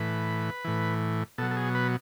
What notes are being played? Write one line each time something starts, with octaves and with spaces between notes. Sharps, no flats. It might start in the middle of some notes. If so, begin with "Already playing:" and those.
Already playing: A2 E3 B4
A2 E3
B2 F#3 A4
A4
G#4
B4